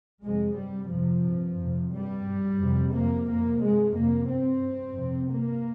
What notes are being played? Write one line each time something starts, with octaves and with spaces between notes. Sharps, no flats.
F2 C3 G#3
G2 G3
F2 C3 F3
G2
F2 C3
G2 G3
G2
F2 C3
F2 C3 A#3
F2 C3 A#3
G2 G#3
F2 C3 A#3
G2 C4
G2
F2 C3
G2 A#3